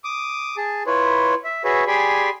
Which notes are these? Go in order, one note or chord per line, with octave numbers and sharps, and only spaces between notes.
D6 D#6
G#4 A5
E4 F4 B4 C#5
E5
F#4 G#4 B4 C#5 E5
G4 G#4 D5 G#5 B5 C6